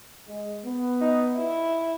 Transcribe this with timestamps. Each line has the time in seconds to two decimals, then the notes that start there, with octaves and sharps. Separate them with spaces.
0.28 G#3
0.65 B3
1.01 D#4
1.37 E4